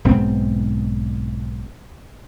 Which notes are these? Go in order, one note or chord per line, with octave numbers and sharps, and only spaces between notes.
B1 G#2 B3 C4